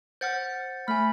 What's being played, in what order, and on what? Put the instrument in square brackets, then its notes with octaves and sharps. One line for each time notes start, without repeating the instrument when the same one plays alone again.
[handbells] C5 F#5 F6 [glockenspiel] G6 A6 C#7
[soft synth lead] A3 [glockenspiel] G#5 F6 [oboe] B5